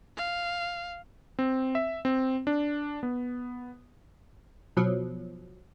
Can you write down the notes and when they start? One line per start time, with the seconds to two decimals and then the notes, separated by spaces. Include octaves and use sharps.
0.17 F5
1.39 C4
1.75 E5
2.05 C4
2.47 D4
3.03 B3
4.77 B2 F3 F#3